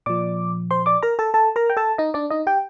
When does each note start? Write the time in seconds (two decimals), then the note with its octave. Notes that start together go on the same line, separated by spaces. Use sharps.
0.06 A#2 F3 D5 D6
0.71 C5 C6
0.86 D5 D6
1.03 A#4 A#5
1.19 A4 A5
1.34 A4 A5
1.56 A#4 A#5
1.70 G5
1.77 A4 A5
1.98 D#4 D#5
2.14 D4 D5
2.30 D#4 D#5
2.47 G4 G5